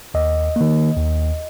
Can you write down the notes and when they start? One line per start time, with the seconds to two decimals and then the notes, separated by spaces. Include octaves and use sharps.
0.14 D#2 D#5
0.56 D#3 A#3
0.97 D#2